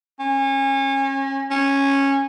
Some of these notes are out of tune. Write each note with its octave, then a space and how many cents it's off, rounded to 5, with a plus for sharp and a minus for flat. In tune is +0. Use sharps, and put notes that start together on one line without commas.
C#4 -30
C#4 -10